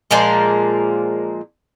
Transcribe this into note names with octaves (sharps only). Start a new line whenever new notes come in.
A#2 F3 G#3 A#3